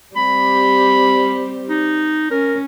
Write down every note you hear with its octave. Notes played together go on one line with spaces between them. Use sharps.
G3 C4 G4 B5
D#4
C#4 A#4